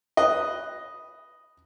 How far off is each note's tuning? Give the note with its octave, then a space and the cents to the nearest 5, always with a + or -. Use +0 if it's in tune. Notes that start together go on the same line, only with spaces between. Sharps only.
B4 +5 D#5 +0